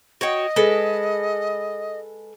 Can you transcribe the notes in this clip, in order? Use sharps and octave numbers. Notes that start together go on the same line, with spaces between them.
F#4 C#5 D#5 G5
G#3 A4 B4